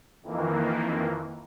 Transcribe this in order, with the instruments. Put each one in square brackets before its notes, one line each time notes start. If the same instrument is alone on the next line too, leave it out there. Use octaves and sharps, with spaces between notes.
[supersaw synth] F2 D#3 E3 A#3